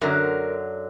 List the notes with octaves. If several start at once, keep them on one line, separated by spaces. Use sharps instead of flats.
F#2 D3 F#3 A#4